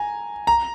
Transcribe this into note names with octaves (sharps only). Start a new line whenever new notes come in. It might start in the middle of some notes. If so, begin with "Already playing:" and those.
Already playing: G#5 A#5
A#5